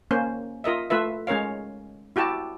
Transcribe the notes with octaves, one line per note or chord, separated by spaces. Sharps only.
A#3 C#4 C5
F4 A#4 D#5 E5
A3 F4 B4 E5
G#3 C#4 A#4 C#5 F5
E4 F#4 G4 A5